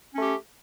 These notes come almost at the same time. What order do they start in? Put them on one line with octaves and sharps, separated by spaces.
C#4 A3 G4